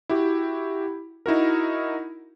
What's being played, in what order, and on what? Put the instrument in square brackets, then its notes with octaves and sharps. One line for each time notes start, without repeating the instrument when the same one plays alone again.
[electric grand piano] E4 F#4 G4
D#4 E4 F#4 A#4